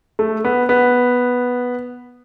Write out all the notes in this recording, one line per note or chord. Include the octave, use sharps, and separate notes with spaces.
A3
B3
B3